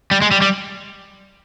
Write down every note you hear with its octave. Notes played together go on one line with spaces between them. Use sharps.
G3
G#3
G3
G3